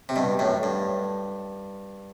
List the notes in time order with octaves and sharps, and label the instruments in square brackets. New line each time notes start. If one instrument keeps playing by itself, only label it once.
[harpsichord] C3
G2 B2
F#2 A2
G2